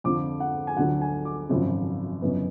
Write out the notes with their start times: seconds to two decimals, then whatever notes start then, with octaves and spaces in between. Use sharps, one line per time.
0.04 F2 D3 F3 D6
0.40 F#5
0.67 G#5
0.76 D2 D3 F#3 F#5
1.01 G#5
1.25 D6
1.50 G#1 F#2 C#3 F3
2.22 F#1 F#2 D3 F#3 B3